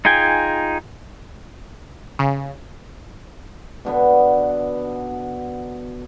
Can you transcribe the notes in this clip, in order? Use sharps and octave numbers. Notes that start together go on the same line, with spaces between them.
D#4 F4 G#4 G5 G#5
C#3
B2 D3 B3